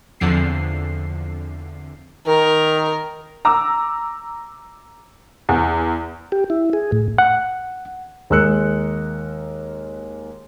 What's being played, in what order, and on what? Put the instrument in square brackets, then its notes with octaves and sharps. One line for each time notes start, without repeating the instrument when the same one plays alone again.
[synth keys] E2 D3 F3 C4 C7
[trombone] D#3 [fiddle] A#4
[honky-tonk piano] A#5 D6 E6
E2
[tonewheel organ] G4
E4
G#4
A2
[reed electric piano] F#5
[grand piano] D#2 G#3 A#4 E6 F#6 C#7